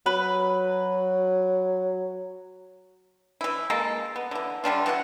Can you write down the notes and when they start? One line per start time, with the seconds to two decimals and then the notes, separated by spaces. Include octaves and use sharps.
0.06 F#3 B4
3.41 E3 E4
3.70 G#3 A#3 A4
4.16 B3
4.31 D3 E3
4.64 D3 G3 D4 F4
4.86 E3 F#4 D5 F#5